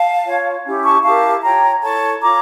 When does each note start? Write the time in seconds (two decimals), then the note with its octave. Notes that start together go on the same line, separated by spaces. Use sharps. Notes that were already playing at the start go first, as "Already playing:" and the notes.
Already playing: F5 A5
0.25 F4 C#5
0.64 C#4 E4 G4
0.84 A5 C#6
1.04 E4 G4 A#4 F5 A5
1.43 F4 C#5 G5 A#5
1.83 E4 A4 C#5 A5 C#6
2.22 F4 C#5 A#5 D6